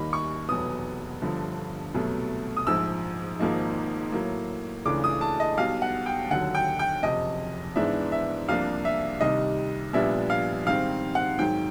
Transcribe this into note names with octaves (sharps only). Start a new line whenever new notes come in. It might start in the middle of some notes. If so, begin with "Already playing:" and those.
Already playing: D#2 D#3 G3 A#3 D#4 B5
C#6
F1 E2 B2 F#3 B3 D#6
G1 G2 D3 F3
C2 B2 F#3 A3
D#6
A#1 G#2 F3 E6
G#1 G#2 F3 A#3 D#4
A2 F#3 A#3
C#2 C#3 E3 A3 D4 D6
D#6
A5
D#5
B1 B2 G3 F5
F#5
G5
D#2 D3 F#3 F#5
G5
G5
F#1 F2 C3 D#5
G#2 E3 G#3 B3 D4 E5
E5
C2 C3 F3 A#3 D4 F5
E5
C2 C3 D#3 G3 D#5
A#1 A#2 G3 B3 D4 E5
F5
G#2 D#3 G3 C4 F5
F#5
G#2 D#3 F#3 G5